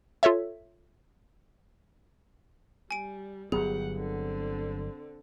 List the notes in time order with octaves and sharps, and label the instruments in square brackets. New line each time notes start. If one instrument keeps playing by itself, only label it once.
[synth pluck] F4 A4 C#5 E5
[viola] G3 [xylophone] G#5 D7
[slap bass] G1 F#3 B3 [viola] G4 F#5 [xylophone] G#4
[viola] D3 C4